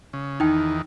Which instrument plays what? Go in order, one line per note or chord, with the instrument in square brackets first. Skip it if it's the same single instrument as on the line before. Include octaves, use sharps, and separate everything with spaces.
[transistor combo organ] C#3
[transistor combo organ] E2 D#3 [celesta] D#4 G5